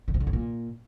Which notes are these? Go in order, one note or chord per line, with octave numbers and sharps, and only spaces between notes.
D3
B2
D3
G#2
A#2